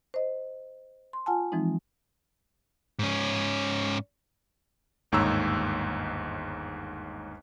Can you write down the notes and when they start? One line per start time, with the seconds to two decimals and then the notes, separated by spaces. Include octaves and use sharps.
0.14 C5 D#5
1.13 C6
1.26 F4 F#5 G#5 A5
1.52 E3 F3 G#3 C4 D#4
2.99 G#2 C#4
5.12 G1 D#2 G#2 C#5 A#5 E6